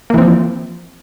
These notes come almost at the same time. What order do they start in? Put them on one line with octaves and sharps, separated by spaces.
A#3 E3 C4 F3